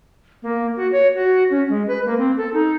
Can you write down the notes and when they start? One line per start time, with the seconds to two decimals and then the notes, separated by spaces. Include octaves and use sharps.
0.43 A#3
0.77 F#4
0.92 C#5
1.15 F#4
1.50 C#4
1.69 G#3
1.87 B4
2.05 A#3
2.18 C4
2.37 A4
2.53 D#4